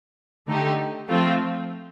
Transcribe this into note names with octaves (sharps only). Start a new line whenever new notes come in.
D3 A3 D#4 G4
F3 A3 C4 F4